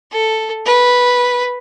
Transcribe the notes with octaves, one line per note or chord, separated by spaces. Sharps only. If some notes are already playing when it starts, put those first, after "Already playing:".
A4
B4